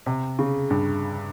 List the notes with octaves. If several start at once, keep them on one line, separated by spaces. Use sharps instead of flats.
C3
C#3
G2